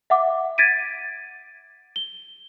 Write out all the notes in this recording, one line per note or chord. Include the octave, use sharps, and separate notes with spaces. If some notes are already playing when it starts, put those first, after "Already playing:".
E5 F#5 D6
G#6 A6 B6 D7 D#7
G7